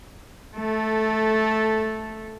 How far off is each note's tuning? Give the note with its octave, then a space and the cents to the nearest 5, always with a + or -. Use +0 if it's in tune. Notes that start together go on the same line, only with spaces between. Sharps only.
A3 -10 A4 +0